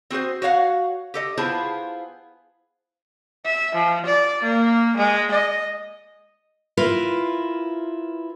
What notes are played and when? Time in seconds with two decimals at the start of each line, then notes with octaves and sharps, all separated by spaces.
0.11 C4 F#4 G#4 C5
0.42 F#4 C#5 F5 F#5
1.14 G4 A4 D#5
1.37 B3 E4 F4 G#4 C5 A5
3.45 E5
3.75 F3
4.06 D5
4.43 A#3
4.97 G#3
5.32 D#5
6.77 E4 F4 A#4 B4